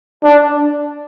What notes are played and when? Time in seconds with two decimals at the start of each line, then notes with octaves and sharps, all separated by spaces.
0.23 D4